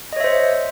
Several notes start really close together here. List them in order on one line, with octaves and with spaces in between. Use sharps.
D#5 C#5 E5 C5